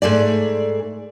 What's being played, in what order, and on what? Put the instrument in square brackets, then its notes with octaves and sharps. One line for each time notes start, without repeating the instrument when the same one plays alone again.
[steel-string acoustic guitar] G#2 A3 G#4 D5